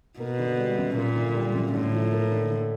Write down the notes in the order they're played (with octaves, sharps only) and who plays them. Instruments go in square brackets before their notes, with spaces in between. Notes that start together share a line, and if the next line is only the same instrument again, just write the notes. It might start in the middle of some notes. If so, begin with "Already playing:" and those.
[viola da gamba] B2 [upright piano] A#3
[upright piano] D3
G3
F#2
[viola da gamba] A#2 [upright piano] A#3
[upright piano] D3
G3
F#2
[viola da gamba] A2 [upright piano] D3
[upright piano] F3
A#3
D3
D3